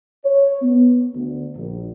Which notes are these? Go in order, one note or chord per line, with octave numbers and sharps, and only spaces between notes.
C#5
B3
D2
A#1